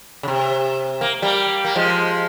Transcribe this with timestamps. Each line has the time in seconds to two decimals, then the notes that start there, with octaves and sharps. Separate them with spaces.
0.23 C#3
0.28 C3
1.01 A#3
1.22 G3 A#3
1.65 A#3
1.76 F3 G#3